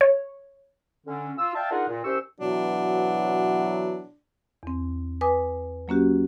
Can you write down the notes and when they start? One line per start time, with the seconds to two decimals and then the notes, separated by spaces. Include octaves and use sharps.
0.01 C#5
1.07 D3 C#4
1.38 F4 E6
1.55 D5 E5 F5 G5 A5
1.71 D4 D#4 F4 G#4 A#4 F#5
1.89 A#2
2.05 C2 C#4 G4 C5 C#6 E6
2.40 B2 E3 F#3 D4
4.63 E2 C4
5.21 B4 G#5 D6 D#6
5.88 F#3 A#3 C#4 F#4 G4